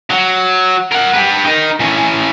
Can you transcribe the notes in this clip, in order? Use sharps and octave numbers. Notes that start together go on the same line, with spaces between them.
F#3
A#4 F#5
G4 B4
D#4 A#4
E3 C#4